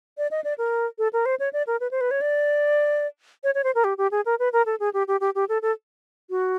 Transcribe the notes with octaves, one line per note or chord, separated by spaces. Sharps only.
D5
D#5
D5
A#4
A4
A#4
C5
C#5
D5
A#4
B4
C5
B4
C#5
D5
C#5
C#5
C5
A#4
G4
G4
G#4
A#4
B4
A#4
A4
G#4
G4
G4
G4
G4
A4
A4
F#4